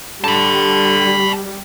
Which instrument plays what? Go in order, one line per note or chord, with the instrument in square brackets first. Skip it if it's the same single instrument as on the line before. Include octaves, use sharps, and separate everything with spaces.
[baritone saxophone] D3 [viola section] G3 [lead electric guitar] A5 B5